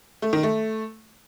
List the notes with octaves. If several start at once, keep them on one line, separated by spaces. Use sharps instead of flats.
A3
D#3
A3